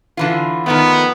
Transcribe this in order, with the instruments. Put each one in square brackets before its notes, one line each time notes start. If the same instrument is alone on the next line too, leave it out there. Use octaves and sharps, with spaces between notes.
[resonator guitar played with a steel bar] D3 E3 F4
[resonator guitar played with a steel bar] D#3 F3 A3 [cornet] B3